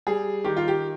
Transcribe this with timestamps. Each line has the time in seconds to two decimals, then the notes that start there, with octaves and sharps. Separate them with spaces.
0.07 G3 G#4
0.44 D#3 G4
0.56 F4
0.68 G4